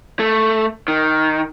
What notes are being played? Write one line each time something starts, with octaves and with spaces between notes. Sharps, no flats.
A3
D#3